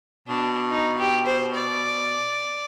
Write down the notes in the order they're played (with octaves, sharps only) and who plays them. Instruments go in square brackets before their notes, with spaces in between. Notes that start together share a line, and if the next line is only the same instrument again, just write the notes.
[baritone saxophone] B2 [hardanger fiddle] D4
[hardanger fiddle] D#4
G4
C5
D5